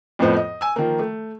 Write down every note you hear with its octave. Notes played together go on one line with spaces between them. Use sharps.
F2 A2 F3 B3 C5 D#5
D#5
G#5 E6
D#3 F3 A#3
A3